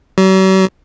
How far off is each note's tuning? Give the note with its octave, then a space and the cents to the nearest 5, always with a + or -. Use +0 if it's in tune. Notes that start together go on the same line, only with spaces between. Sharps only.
F#3 +45